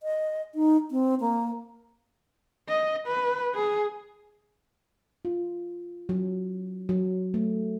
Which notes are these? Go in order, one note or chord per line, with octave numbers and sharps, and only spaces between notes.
D#5
D#4
C4
A#3
D#5
B4
G#4
F4
F#3
F#3
A3